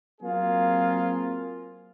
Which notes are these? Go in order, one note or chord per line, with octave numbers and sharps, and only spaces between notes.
F#3 A#3 C4 F4 G#4 A#4